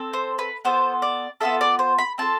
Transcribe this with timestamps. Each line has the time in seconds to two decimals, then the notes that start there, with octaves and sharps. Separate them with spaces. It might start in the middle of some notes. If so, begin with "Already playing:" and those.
Already playing: C4 A4
0.13 C5
0.39 B4
0.65 B3 F4 A4 C5
1.02 D5
1.41 B3 F4 A4 E5
1.61 D5
1.79 C5
1.98 B5
2.18 C4 F4 A4 A5